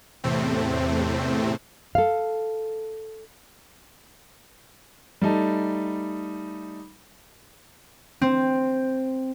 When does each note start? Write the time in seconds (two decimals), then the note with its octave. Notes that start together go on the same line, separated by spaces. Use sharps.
0.24 E2 A2 C3 A3 C4
1.95 A4 F5
5.21 G3 A3 D#4 A5
8.21 C4